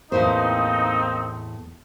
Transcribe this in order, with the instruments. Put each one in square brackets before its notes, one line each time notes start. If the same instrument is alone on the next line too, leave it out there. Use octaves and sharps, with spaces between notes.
[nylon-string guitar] E2 A2 C5 [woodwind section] A#3 C4 D#4